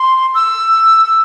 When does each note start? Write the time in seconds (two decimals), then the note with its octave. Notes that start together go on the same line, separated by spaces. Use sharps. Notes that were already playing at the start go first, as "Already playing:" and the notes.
Already playing: C6
0.35 E6